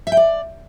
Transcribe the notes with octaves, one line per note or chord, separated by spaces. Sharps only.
E5
G5
D5